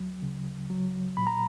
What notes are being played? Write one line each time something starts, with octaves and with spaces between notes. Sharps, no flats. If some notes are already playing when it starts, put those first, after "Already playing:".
Already playing: D2 F#3
C#3
F#3
A#2 B5
A#5